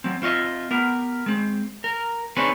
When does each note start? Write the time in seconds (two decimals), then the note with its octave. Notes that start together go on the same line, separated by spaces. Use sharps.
0.04 F#3 C4
0.22 C4 F4 C#5 D#5 E5
0.71 B3 G4 A#4
1.26 G#3 C4
1.84 A#4
2.37 C4 D4 D#4 G#4 B4 C#5